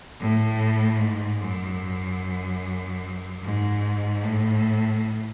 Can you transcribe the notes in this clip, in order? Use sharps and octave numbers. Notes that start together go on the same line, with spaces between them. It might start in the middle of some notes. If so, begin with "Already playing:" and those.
A2
G#2
F#2
G#2
A2